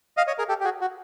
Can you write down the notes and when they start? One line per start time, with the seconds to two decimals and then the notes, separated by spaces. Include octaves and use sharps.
0.17 D#5 F5
0.27 C#5 D#5
0.38 G#4 A#4
0.49 G4 A4
0.60 G4
0.65 F#4 G#4
0.81 F#4